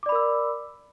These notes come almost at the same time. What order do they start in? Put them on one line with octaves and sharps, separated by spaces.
D6 D5 B5 A#4 E6